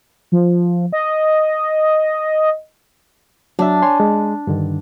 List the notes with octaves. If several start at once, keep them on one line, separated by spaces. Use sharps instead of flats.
F3
D#5
F#3 D4 E5
C#5 G#5 C6
G#3
G2 D3 D#3